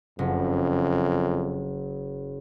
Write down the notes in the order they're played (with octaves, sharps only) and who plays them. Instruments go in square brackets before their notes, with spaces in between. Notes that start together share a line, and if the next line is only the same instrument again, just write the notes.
[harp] F#1 [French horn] F2